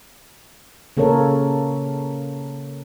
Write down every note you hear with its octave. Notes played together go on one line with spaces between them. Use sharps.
C#3 A#3 A4 A#4 C#5